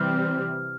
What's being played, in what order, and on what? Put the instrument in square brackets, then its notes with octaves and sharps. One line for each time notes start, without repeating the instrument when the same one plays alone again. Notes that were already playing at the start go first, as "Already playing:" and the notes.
Already playing: [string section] C3 E3 G3 C4 [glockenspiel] F6